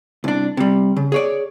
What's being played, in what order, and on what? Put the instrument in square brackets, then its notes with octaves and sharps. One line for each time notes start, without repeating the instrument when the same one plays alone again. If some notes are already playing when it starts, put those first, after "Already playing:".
[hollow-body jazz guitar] C2 D4
C3 G3
C#3
G#4 C#5 D5